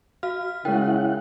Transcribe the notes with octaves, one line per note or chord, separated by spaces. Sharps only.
F#4 F5 F6
C#3 G#3 E4 A#4 F#5 G5